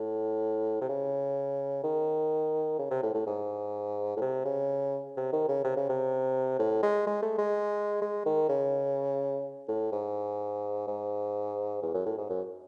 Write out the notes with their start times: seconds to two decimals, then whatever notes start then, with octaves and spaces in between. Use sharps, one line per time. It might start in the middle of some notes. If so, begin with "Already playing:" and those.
Already playing: A2
0.81 C3
0.89 C#3
1.83 D#3
2.79 C#3
2.91 C3
3.03 A2
3.14 A2
3.27 G#2
4.17 A2
4.21 C3
4.45 C#3
5.17 C3
5.32 D#3
5.49 C#3
5.64 C3
5.77 C#3
5.89 C3
6.59 A2
6.83 G#3
7.07 G#3
7.22 A3
7.38 G#3
8.02 G#3
8.26 D#3
8.49 C#3
9.68 A2
9.92 G#2
10.87 G#2
11.82 E2
11.94 F#2
12.06 A2
12.18 G#2
12.29 F#2